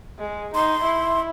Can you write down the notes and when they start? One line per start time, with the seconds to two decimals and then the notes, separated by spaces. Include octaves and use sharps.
0.19 G#3
0.55 D#4 C6
0.84 E4